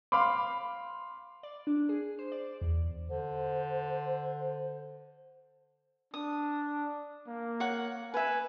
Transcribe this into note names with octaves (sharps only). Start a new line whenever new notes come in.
F5 B5 C6 D6
D5
D4
G#4
C5
D5
E2
D3 C5
D4 D#6
A#3
C#5 F#5
B4 E5 G#5